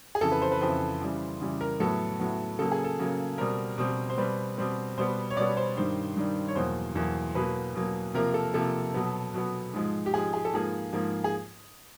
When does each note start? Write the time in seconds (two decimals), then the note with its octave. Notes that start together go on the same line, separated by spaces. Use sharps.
0.15 G#4
0.21 F2 C#3 E3 A4
0.32 B4
0.42 C5
0.52 B4
0.61 F2 C#3 E3 C5
1.01 C#3 E3 G3
1.41 C#3 E3 G3
1.61 A#4
1.80 A2 F#3 B3 A4
2.20 A2 F#3 B3
2.59 C#3 F#3 A#3 A4
2.72 G#4
2.84 A4
2.99 C#3 F#3 A#3
3.38 B2 G3 C4 A#4
3.78 B2 G3 C4
4.10 C5
4.17 B2 G3 C4 B4
4.58 B2 G3 C4
4.98 B2 G3 B3 C5
5.30 C#5
5.37 B2 G3 B3 D5
5.57 C5
5.77 G2 D#3 G3 C5
6.17 G2 D#3 G3
6.48 C#5
6.56 E2 B2 F#3 A#3 C5
6.95 E2 B2 F#3 A#3
7.35 B2 F#3 A#3 B4
7.75 B2 F#3 A#3
8.14 C3 F3 A#3 A#4
8.34 A4
8.54 C3 F3 A#3 A4
8.94 B2 F#3 B3
9.34 B2 F#3 B3
9.73 G#2 F3 G#3
10.06 G4
10.13 G#2 F3 G#3 G#4
10.34 G#4
10.45 A4
10.53 G#2 F3 A#3 G#4
10.93 G#2 F3 A#3
11.24 G#4